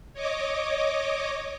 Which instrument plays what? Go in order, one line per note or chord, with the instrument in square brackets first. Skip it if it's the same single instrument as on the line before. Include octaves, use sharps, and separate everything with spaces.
[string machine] C#5 D#5 D6